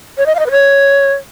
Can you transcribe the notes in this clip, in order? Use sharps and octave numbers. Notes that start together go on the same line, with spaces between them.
C#5
D#5
F5
D#5
B4
C#5